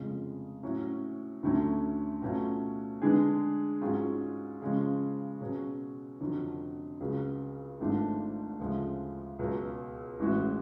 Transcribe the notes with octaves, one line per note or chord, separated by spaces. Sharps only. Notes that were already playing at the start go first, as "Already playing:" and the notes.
Already playing: F1 F2 C#3 G#3
A2 F#3 C#4
D2 D3 F#3 A3 C#4
B2 F#3 A3 C#4 F4
D3 G#3 D4 G#4 B4
G#2 F#3 C#4 F4 G#4
C#3 F3 G#3 C#4
B2 F#3 C#4 G#4
F1 F2 D3 F#3
C#2 C#3 F#3
G#1 G#2 F3 A3 D4
D2 C#3 F3 G#3
C#2 B2 F#3
A1 A2 G#3 C#4 F#4